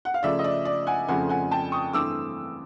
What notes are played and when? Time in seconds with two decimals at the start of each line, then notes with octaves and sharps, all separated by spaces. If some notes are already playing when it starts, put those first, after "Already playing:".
0.05 F#5
0.14 F5
0.23 C#3 F3 A3 D5 E5
0.39 D#5
0.44 D5
0.65 D5
0.87 F#5 G#5
1.08 F2 C#3 F3 A3 C4 F#5 G#5
1.29 F#5 G#5
1.51 G5 A5
1.72 C#6 D#6
1.93 G2 E3 A3 C4 D6 E6